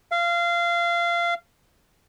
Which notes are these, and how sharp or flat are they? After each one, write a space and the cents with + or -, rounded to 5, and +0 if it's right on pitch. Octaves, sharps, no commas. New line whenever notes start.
F5 -20